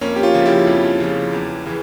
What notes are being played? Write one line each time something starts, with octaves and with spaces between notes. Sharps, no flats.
F2 A#3 C#4
G4
C#4 F4
C#3 F3
E4 G4
F2
C#3 F3
E2
C#3 E3